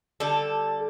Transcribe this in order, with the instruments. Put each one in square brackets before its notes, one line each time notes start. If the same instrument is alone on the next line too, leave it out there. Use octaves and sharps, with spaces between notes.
[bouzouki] D3 G3 A4